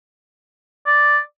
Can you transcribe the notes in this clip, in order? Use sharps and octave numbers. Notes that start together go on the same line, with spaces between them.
D5